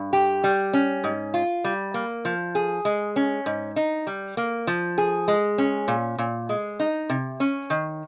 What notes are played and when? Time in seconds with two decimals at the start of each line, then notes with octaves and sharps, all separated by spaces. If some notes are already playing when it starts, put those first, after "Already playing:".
Already playing: G2
0.13 G4
0.44 G3
0.73 C#4
1.04 G#2
1.34 F4
1.64 G3
1.94 A#3
2.25 F3
2.55 G#4
2.85 G#3
3.16 C#4
3.46 G#2
3.76 D#4
4.07 G3
4.37 A#3
4.67 F3
4.98 G#4
5.28 G#3
5.58 C#4
5.88 A#2
6.19 A#2
6.49 G#3
6.80 D#4
7.10 C3
7.40 C#4
7.70 D#3